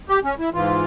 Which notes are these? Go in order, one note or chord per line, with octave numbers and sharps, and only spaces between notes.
G4
C#4
E4
G#2 E3 F4